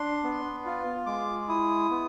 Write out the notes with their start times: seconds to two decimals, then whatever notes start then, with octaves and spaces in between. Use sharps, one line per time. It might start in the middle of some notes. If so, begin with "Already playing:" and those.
Already playing: D4 C6
0.23 B3
0.65 F4
1.06 G#3 D6
1.48 E4 D#6
1.90 B3